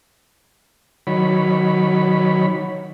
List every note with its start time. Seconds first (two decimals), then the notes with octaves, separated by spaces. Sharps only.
1.07 D#3 F#3 C#5 B5